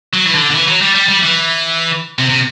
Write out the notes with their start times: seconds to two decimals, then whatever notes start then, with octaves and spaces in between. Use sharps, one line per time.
0.13 F#3
0.25 E3
0.34 D3
0.50 D3
0.55 E3
0.68 F#3
0.81 G3
0.95 G3
1.08 G3
1.23 E3
2.19 C3
2.30 C3